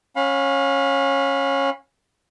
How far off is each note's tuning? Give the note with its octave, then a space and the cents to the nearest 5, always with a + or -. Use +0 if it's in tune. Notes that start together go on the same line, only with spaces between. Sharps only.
C#4 -15 F5 +35 B5 +0